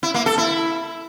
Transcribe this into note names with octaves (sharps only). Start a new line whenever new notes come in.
E4
A#3
A4
E4